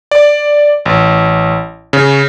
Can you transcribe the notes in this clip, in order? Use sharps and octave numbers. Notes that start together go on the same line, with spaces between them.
D5
A1
C#3